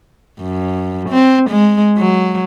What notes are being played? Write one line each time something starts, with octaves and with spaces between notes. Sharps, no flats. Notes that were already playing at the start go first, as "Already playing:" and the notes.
F#2
C4
G#3
F#3